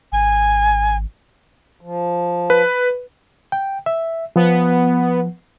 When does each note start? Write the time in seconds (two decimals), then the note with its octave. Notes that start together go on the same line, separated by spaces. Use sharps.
0.12 G#1 G#5
1.81 F3
2.50 B4
3.52 G5
3.86 E5
4.36 F3 B3